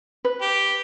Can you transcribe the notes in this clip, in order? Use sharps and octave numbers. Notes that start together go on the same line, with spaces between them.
B4
G4